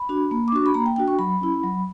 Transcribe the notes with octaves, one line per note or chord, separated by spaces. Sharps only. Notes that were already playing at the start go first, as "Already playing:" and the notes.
Already playing: B5
D4 F#4
A#3
D6
D4 F#4 C#6
B5
A#3 A#5
G5
D4 F#4 G5
C#6
F#3 B5
C#4 E4
F#3